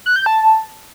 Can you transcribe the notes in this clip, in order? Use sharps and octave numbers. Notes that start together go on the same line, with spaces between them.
F#6
G6
A5